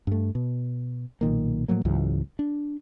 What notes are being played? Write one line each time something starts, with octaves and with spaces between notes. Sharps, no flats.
G2 A3
B2
B1 A#2 D#3 A#3
A2 F3 F#3 A#3
C#2 G#2 E3 F#3
D4